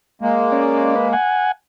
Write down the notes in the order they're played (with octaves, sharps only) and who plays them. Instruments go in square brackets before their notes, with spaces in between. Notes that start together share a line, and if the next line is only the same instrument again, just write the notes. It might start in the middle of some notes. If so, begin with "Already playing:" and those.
[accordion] G#3 A#3
[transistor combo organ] C#4 D5
B4
F#5 G#5